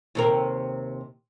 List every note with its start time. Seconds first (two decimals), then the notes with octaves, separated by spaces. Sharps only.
0.15 D#2 C3 A#4